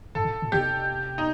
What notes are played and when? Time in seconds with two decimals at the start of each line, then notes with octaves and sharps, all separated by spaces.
0.15 G2 A4
0.25 A2
0.42 A2
0.52 C3 G4
1.18 D#4